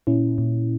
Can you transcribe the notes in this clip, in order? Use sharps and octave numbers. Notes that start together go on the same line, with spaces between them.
A#2 C#4 E4
A#2